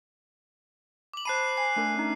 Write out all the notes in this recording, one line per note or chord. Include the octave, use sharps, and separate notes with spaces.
D6 F#7
C5 A5 B5 F#6 C7 D#7
G#5 C7
A3 D4 A#4
C#4 D#4